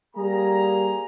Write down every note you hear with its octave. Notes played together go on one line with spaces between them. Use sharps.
G3 A#3 G#4 A#5